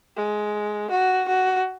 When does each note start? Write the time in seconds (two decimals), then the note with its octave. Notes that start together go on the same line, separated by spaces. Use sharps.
0.17 G#3
0.91 F#4
1.28 F#4